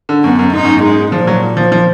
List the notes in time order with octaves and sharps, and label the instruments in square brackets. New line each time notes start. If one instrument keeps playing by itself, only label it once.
[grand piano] D3
[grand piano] F#2 [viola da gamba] B3
[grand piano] F#2
[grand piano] G#2 [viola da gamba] D#4
[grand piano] F#2
G#2
[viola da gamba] G#3
[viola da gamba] A#2 [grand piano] F3
[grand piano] F#3
F3
F3